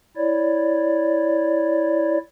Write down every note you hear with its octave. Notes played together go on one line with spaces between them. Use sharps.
E4 C#5 D5